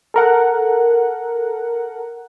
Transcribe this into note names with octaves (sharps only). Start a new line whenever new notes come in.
A4 A#4 F#5